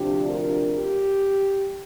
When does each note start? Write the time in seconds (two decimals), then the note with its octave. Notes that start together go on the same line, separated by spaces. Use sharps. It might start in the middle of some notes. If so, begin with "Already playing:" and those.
Already playing: D2 C3 F3 D4 G4
0.26 F4 A#4
0.76 G4